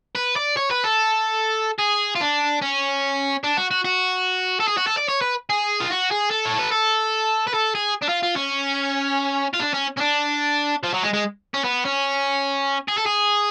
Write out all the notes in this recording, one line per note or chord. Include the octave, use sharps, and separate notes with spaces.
B4
D5
C#5
B4
A4
G#4
F4
D4
C#4
D4
F#4
F#4
F#4
A4
G#4
F#4
A4
D5
C#5
B4
G#4
F4
F#4
G#4
A4
C#5
B4
A4
B4
A4
G#4
D4
F4
F4
C#4
F4
D4
C#4
C#4
D4
F3
F#3
G#3
G#3
C#4
B3
C#4
G#4
A4
G#4